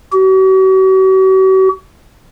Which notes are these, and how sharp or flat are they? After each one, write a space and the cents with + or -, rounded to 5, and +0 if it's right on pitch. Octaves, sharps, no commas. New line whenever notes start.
F#4 +45